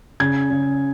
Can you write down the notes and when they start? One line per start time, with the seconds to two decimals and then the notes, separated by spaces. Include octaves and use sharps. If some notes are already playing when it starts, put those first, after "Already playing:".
0.20 C#3 G#6
0.50 C#3